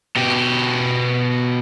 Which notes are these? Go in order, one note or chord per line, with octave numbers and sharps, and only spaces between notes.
B2 G4